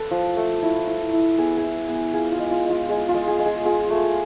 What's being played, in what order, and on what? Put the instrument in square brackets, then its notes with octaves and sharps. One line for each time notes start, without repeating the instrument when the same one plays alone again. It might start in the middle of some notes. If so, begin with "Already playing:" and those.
Already playing: [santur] A4 B4
F3
A3
E4
E4
E4
B3 G#4
G#4
E4
B3
G#4
F4 G#4
F4
G#3
F4
G#3
F4
G#3 G#4
F4
G#3
G#4
G#3
G#4
F4 G#4
A3